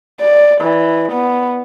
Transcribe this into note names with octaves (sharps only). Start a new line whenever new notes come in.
D5
E3
B3